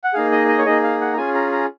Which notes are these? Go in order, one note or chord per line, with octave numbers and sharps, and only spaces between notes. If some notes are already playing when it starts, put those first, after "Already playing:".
F#5
A#3 D#4 G#4 F5
D#5
D#5
C#5
A#3 D#4 G#4 D#5
F5
F#5
A#5
C#4 F4 G#4 G#5
A#5
A#5